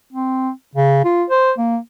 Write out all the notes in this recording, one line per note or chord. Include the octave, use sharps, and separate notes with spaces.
C4
C#3
F4
C5
A#3